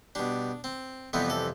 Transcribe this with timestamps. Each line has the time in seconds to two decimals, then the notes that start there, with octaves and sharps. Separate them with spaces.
0.15 B2 G3 D4
0.64 C4
1.13 F2 C3 E3 G3 B3
1.30 A4